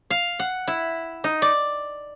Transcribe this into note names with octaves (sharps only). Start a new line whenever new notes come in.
F5
F#5
E4
D#4
D5